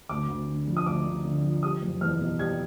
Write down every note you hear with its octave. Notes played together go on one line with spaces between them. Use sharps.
D2 D6
D2
D3
F3
D#6
D2 D6
D2
D3
F3
G3 D#6
F#1
E2 F6
B2
G3 G#6